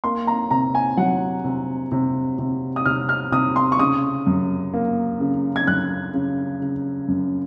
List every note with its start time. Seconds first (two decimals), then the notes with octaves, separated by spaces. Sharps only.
0.04 A#3 C6
0.27 A#5
0.51 C3 A#5
0.75 G#5
0.97 F#3 F#5
1.45 C3
1.92 C3
2.39 C3
2.76 D#6
2.86 C3 F6
3.09 F6
3.32 C3 D#6
3.56 C6
3.72 C#6
3.79 C#3 D#6
4.27 F#2
4.74 A#3
5.20 C#3
5.56 G#6
5.67 F#2 F#6
6.14 C#3
6.61 C#3
7.08 F#2